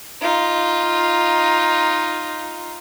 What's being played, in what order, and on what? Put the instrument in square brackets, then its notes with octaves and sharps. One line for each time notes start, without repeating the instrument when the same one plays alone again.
[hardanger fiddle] D#4 F4